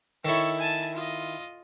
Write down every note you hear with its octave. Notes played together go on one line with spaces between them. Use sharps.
D#3 E4 A4 C#5
G#5 A5
F4 D#5